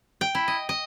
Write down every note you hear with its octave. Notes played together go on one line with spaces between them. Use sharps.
G5
E4
D#5
D#5